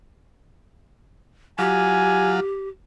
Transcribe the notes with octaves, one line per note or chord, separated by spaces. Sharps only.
F#3 F4 G4 G#5